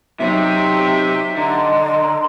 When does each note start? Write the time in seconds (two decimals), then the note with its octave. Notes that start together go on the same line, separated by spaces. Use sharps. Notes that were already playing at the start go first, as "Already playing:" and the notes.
0.20 C3 F#3 C4 D#4 G4 E5
1.37 D3 D#5 A#5 C6